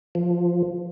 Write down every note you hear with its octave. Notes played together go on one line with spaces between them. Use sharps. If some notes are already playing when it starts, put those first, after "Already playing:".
F3